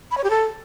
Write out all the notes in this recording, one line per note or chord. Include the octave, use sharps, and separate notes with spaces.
B5
C#5
G4
A4